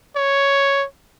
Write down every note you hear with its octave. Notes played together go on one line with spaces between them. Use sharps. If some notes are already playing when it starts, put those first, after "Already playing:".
C#5